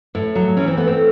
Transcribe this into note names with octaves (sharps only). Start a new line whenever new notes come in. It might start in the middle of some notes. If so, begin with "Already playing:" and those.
A2
F#3
E3 C#4
C4
A3 B3
C4